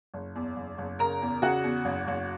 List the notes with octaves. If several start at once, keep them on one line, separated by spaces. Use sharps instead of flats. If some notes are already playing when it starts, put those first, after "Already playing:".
F#1
E2
F#1
F#1
C#3 A#4 A#5
E2
C#3 F#4 F#5
E2
F#1
F#1